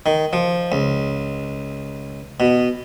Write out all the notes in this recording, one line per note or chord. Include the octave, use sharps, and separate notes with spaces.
D#3
F3
C#2
B2